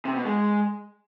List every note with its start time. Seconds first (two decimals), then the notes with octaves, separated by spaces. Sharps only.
0.05 C3
0.15 B2
0.25 G#3